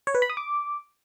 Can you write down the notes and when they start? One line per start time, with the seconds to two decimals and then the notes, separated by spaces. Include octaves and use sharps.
0.07 C#5
0.15 B4
0.22 B5
0.30 D#6
0.37 D6